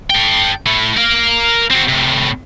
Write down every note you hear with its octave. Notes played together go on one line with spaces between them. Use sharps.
A4 G5
A3 E4
A#4 F5
C4 F#4
A2 C3